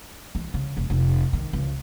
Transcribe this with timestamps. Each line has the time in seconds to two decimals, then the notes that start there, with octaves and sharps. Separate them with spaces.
0.35 E3
0.54 C#3
0.77 E1
0.90 F1
1.33 D#3
1.53 C#2